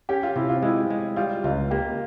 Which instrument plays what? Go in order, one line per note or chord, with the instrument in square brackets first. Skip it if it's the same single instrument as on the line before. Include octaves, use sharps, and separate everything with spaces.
[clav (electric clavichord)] C#4 [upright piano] G4
[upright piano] F4
[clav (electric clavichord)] C3 [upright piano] E4
[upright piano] F4
[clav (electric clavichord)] G#3 [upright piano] E4
[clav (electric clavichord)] G#3
[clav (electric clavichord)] G3 [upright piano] F4
[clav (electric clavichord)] C#2 [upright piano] F4
[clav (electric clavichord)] A#3 [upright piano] G4